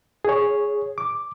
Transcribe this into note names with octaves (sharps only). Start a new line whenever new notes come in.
G#4 C#5
D6